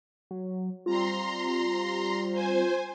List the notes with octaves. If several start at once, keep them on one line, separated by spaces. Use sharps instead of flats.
F#3
G3 C4 F4 A#5 C6
C5 G#5